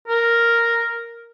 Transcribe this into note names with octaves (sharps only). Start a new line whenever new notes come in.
A#4